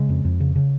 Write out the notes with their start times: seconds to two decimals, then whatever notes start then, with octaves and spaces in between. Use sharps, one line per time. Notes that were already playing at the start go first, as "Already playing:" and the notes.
Already playing: C#3 G#3
0.09 F2
0.25 F2
0.40 C#3
0.56 C#3